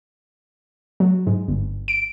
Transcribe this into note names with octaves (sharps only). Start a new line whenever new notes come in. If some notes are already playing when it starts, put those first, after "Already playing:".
F#3
G#2
G1
D7